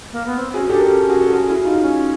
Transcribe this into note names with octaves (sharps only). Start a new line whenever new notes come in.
A#3
B3
C4
C#4 F#4 G#4
D4 G4 A4
A#4
C#4 G4 A4
F#4 G#4
A4
F#4 G#4
E4 F#4
D#4 F4
C#4